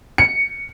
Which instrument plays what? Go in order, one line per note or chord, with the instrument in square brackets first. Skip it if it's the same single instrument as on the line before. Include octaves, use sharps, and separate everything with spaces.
[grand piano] C#7